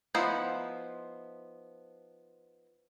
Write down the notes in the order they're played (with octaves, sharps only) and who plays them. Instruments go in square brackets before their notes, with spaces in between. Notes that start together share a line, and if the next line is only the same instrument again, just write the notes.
[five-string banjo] F3 B3 D#4 E4 C5